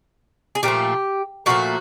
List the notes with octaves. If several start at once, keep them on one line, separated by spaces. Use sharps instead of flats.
G#4
A#2 F3 A3 G4
A#2 F3 A3 F#4